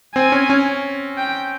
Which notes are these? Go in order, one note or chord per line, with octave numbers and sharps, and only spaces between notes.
C4 G#5
C#4
C#4
G5